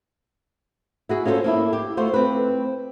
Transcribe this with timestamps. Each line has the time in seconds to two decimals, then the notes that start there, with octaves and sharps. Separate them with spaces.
1.09 E4 F#4 G#4
1.25 C#4 E4 F4 G#4 A4 C5
1.44 A#3 D4 E4
1.73 G4
1.97 A3 F4 F#4 C5
2.14 C4 B4